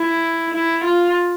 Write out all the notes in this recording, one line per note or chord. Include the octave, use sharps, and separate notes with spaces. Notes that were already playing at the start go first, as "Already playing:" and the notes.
Already playing: E4
E4
F4